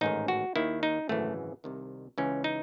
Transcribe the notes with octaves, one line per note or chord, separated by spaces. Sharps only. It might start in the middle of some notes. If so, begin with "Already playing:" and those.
A1 G#2 D#3 D#4
F#4
D#2 D#3 E4
D#4
G#1 F#2 C#3 E3 A3
C2 C3 D#3
C#2 C#3 E3 C#4
D#4